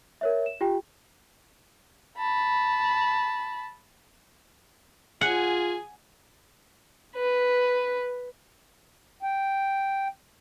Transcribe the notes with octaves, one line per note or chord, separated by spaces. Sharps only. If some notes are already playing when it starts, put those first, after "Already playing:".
A#4 C#5 E5
E7
F4 G4 G5
A5 B5
F4 G#4 F#5 G#5
B4
G5